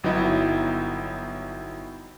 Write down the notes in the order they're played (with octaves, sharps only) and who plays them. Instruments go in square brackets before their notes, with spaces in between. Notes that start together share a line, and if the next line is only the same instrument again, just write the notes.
[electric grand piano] G1 F#3 B3 D#4 E4